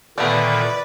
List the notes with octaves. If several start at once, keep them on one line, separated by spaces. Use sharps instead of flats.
A#2 D3 D#3 A3 B3 B4 D5